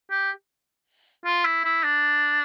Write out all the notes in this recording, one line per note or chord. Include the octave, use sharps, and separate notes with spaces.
G4
F4
E4
E4
D4